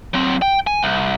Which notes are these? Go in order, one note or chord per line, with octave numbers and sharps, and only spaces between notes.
F#3 C4
G5
G#5
C2